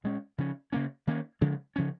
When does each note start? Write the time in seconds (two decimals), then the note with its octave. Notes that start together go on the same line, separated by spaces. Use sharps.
0.04 A#2 G#3 C#4
0.38 C#3 F3 C#4
0.72 C#3 A#3 C#4
1.07 D#3 A#3 C#4
1.41 C#3 F3 G#3
1.76 C#3 F3 C#4